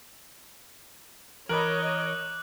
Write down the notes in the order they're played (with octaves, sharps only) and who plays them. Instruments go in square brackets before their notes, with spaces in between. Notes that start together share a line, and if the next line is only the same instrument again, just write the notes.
[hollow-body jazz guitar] E3 B5 [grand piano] A#4 [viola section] C#5 D#5 [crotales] D6 F#6 F#7